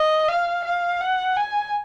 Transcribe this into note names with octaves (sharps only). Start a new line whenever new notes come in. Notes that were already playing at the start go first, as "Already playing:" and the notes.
Already playing: D#5
F5
F5
F#5
G#5